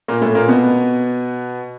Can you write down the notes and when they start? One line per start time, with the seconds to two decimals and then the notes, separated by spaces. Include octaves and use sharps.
0.08 A#2 A#3
0.22 A2 A3
0.35 A#2 A#3
0.48 B2 B3